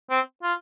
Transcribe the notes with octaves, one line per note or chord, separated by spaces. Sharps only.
C4
F4